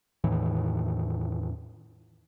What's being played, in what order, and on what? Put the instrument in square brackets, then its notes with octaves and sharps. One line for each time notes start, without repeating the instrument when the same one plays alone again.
[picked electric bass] E2 A2 D#3 E3